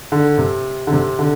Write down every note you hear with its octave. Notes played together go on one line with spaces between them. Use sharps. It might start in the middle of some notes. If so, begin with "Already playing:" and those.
D3
C3
D3
C3
D3